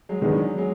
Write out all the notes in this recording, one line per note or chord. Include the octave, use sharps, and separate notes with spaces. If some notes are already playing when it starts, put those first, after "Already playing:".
F#3 G#3
D#3 G#3 B3 D4
E3 F#3
F#3 G#3